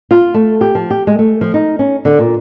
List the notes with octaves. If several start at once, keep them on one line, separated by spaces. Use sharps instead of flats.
F4
A3
G4
F3
G4
G#3
A3
F3
D#4
C#4
D3
A#2